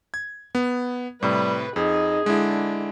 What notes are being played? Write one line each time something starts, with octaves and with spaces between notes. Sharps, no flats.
G#6
B3
A2 C3 G3 B4
F2 D#4 G#4
D3 G#3 E4